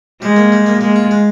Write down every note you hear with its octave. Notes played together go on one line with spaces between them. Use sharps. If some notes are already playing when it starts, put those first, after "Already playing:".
G3 G#3
A#3
G3
A#3
G#3 A#3
F4
G#3